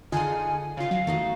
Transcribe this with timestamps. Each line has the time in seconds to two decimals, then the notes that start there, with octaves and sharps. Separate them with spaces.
0.12 D3 D#4 F4 G#4 F#5 G#5
0.77 C#3 F4 F5
0.91 F#3
1.07 A3 D#4 F#4